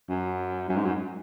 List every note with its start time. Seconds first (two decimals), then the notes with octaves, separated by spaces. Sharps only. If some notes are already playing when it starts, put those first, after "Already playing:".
0.09 F#2
0.69 F#2
0.77 G#2
0.85 F#2